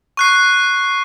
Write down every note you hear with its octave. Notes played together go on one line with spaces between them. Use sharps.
C#6 F#6 C7